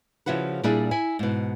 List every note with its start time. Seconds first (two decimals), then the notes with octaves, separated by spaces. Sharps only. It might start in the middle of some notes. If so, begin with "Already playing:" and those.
0.26 C#3 F3 E4 F#4 B4
0.63 A#2 G3 D4 E4 G#4 D5
0.91 E4 G#5
1.19 G#2 B2